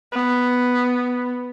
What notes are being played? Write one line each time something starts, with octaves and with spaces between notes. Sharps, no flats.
B3